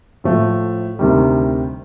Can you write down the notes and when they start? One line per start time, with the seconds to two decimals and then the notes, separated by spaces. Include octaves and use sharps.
0.24 A2 F3 A3
0.99 D2 C3 D#3 G3